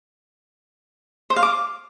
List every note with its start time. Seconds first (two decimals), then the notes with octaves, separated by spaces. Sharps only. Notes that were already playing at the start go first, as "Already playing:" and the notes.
1.30 C5
1.36 F5
1.43 D6